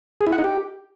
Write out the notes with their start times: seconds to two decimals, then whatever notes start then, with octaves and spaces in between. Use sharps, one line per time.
0.21 G#4
0.27 E4
0.32 F#5
0.38 D#4
0.44 G4